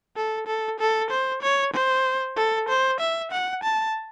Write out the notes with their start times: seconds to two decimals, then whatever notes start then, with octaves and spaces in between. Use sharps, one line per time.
0.16 A4
0.47 A4
0.80 A4
1.10 C5
1.42 C#5
1.73 C5
2.36 A4
2.68 C5
3.00 E5
3.31 F#5
3.63 A5